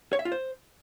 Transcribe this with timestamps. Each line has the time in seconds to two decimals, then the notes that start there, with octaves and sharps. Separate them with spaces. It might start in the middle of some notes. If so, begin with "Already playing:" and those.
0.13 C#5
0.19 E5
0.25 F4
0.32 C5